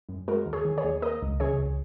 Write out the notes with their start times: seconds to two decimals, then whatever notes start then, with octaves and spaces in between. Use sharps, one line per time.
0.09 F#2
0.28 G#3 F#4 A#4
0.46 D#2
0.53 G#4 C#5
0.65 D#3
0.78 G#4 C#5
0.84 D#2
1.02 A#3 A#4 D#5
1.22 C#2
1.40 C#3 G#4 C#5
1.59 C#2